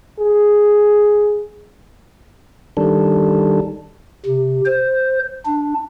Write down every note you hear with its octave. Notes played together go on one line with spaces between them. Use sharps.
G#4
D#3 G3 D4 A4
C3
C5
D4